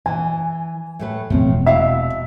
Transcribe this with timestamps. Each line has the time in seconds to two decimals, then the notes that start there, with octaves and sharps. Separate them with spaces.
0.06 E3 G#5
0.99 A2 A3 B4
1.30 E1 E2 A2 F3 C4
1.66 B2 E4 E5 F5